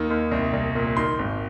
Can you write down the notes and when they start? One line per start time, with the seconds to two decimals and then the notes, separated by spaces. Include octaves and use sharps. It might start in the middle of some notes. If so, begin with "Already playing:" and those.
Already playing: D#2 D#3
0.10 D#2
0.31 C2
0.53 C2
0.75 A#2
0.97 D#3 C6
1.19 G#1